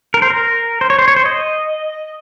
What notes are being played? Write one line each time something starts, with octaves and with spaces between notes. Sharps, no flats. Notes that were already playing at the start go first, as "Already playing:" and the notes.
A#4
C5
A#4
C5
C#5
C5
C#5
C5
D#5